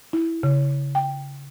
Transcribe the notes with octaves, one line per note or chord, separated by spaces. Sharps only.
E4
C#3
G5